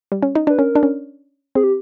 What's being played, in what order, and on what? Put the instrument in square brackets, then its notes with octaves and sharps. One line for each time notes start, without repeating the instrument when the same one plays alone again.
[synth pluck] G3
C#4
D#4
[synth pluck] D4 [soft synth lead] B4
[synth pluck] C#4 [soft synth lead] A#4
[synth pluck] D4
C#4
[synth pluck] C4 [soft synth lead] G#4
[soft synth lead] G4